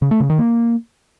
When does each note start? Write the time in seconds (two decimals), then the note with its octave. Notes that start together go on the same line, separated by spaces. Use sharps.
0.02 C#3
0.11 A3
0.20 C#3
0.30 D#3
0.39 A#3